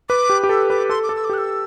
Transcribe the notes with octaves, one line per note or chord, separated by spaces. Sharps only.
B4 D6
G4
G4
A4 E6
B4 D6
A4 C6
D6
A4
E6
D6
G4 F#6
E6